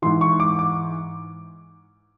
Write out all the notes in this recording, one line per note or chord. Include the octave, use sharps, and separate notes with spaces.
G#2 E3 C6
C#6
D6
D6